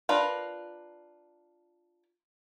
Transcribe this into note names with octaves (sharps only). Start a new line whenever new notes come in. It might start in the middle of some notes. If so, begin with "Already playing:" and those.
D4 F4 A#4 B4